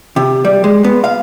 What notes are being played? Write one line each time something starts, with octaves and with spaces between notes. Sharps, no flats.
C3
G3
G#3
B3
F5